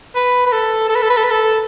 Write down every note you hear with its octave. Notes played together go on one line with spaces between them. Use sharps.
B4
B4
A4
A4
B4
A4
B4
A4
B4
A4